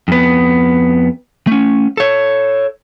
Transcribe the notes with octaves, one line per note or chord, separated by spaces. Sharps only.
F2 B3
A3 C#4
A4 C#5